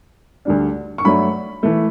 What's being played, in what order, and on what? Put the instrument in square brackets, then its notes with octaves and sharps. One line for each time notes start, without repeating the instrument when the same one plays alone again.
[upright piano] D2 D3 G3 D4
C#6
G2 F#3 A3 D4 B5
E3 A3